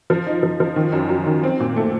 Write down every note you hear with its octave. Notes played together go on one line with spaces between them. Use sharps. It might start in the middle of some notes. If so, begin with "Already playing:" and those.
F3
D#4
F3
F3
D#3
F#2
F#2
D#3
C4
A#2
A3